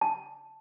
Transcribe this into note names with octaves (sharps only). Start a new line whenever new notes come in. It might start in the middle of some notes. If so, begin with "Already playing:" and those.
A5